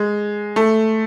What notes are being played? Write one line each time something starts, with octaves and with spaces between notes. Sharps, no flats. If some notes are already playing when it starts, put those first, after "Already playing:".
Already playing: G#3
A3